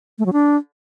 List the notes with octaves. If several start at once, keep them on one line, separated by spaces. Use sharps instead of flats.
A3
F#3
D4